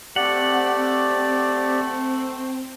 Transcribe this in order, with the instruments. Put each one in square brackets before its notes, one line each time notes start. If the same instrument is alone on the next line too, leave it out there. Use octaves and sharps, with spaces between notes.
[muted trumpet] A3 [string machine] C4 [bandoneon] G4 D5 [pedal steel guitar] F#5